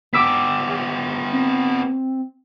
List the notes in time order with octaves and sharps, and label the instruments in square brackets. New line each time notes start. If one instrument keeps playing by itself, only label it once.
[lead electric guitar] B3 G4 [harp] D6 E6 B6
[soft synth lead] C4